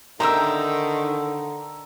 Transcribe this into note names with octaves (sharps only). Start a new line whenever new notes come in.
D3 D#3 C5 E5 G5 A#5 E6